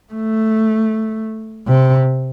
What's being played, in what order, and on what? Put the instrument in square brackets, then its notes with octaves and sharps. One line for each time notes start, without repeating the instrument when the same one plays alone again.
[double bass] A3
C3